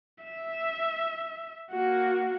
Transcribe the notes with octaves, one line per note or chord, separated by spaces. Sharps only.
E5
A#3 F#4